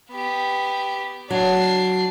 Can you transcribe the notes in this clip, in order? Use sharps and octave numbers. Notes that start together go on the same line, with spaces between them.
B3 G4
F#3 D4 C7